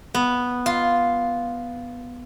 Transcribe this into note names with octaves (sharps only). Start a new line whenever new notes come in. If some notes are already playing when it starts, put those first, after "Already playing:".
B3
F4